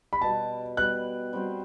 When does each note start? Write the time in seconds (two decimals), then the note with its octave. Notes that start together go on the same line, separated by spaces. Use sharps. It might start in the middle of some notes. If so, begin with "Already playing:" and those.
0.13 B5
0.21 B2 G3 B3 A5
0.77 B2 G3 B3 F#6
1.33 G3 C4 F#4 C5